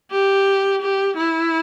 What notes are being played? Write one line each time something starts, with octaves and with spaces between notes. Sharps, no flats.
G4
G4
E4